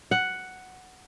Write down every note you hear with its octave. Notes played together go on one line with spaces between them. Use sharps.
F#5